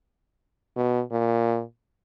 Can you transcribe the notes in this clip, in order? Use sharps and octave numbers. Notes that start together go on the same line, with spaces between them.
B2
A#2